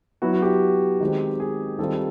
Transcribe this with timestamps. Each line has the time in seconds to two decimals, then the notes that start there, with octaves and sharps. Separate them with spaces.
0.22 F#3 B3 E4 F#4
0.33 F#4
0.42 G4
1.01 D#3 G#3 C4
1.40 G#4
1.79 D#3 G3 C4 F4 A4